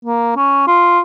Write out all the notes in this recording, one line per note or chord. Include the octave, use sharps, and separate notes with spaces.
A#3
C#4
F4